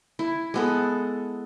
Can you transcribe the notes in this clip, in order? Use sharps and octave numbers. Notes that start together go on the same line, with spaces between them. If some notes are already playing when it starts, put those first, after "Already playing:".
E4
G#3 B3 A4